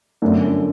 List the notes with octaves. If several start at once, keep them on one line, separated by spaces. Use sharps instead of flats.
G1 F#2 D3 A3